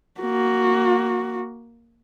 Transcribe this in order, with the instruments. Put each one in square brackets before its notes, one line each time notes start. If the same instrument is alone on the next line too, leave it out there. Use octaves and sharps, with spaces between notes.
[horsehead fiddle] A#3 F#4